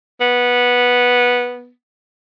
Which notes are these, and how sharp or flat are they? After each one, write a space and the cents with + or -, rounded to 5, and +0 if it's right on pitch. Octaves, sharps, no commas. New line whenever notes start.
B3 -10